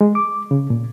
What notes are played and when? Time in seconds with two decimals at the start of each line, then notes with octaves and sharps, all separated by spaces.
0.01 G#3
0.15 D6
0.51 C#3
0.70 A#2